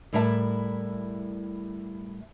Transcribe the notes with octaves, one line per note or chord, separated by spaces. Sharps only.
A2 G3 E4 A#4 E5 A5